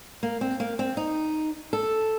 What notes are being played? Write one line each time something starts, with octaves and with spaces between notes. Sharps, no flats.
A#3
C4
A#3
C4
D#4
A4